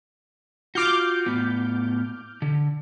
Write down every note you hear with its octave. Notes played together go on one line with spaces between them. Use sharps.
F4 F#4 D6 F6 G6
A2 B3
D3